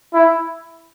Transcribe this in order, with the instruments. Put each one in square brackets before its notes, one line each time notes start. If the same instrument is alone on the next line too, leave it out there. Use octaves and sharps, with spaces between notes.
[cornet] E4